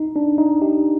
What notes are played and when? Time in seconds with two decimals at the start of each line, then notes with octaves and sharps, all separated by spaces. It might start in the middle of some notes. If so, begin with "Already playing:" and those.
Already playing: D#4
0.16 D4
0.38 D#4
0.62 D#4 G4